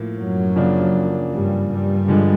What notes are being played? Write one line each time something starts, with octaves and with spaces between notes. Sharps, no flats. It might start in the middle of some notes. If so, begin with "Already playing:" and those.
Already playing: A2 F3 A#3
F#2 F#3
C#3 F3 A#3 D4
G2 G3
G2 G3
D3 F3 G#3